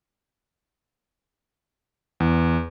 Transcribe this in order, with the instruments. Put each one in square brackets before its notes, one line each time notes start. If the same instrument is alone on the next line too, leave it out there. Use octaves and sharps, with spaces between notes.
[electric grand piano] E2